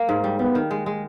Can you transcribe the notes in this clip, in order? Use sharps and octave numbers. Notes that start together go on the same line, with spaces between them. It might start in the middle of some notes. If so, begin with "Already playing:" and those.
Already playing: A#3
G#2 G#3
G3
G3 B3
D#3
G#3
G#3